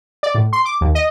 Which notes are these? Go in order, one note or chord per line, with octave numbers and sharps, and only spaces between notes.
D5
A2
C6
D6
D#2
D#5